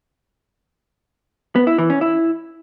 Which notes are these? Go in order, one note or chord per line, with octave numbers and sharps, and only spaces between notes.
B3
E4
E3
C#4
E4